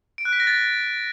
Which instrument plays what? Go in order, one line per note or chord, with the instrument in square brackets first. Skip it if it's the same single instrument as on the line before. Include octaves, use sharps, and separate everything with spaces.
[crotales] D7
F#6
B6
A#6
A6